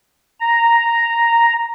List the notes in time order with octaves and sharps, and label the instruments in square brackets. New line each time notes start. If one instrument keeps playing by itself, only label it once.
[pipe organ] A#5